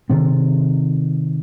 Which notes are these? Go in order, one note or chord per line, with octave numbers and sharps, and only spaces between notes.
C3 D#3 C4